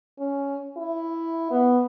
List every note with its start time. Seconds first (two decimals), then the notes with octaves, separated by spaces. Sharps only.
0.19 C#4
0.77 E4
1.51 B3